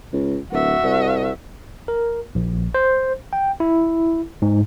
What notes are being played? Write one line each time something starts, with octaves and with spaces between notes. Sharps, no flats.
C#2
D1 F#4 E5
C2
A#4
A#1
C5
G5
E4
G#2